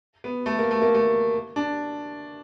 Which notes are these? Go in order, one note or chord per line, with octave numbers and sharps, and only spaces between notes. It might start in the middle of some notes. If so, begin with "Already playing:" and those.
B3
A3
A#3
A3
A#3
A3
D4